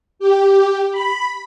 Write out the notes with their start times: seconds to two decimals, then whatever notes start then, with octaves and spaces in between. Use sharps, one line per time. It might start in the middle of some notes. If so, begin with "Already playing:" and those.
0.19 G4
0.92 B5